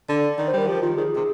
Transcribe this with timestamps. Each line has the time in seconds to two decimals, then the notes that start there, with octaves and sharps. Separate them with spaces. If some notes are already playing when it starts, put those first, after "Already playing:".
0.08 D3 D5
0.38 D#3 D5
0.48 C5
0.53 G3 A#4
0.67 F3 G4
0.82 D#3 F4
0.97 D#3 G#4
1.16 C3